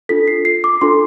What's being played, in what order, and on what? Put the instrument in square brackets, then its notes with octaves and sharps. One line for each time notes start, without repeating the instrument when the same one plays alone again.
[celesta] D4 F4 A4 B6
C7
C7
D6
D4 F4 A4 C6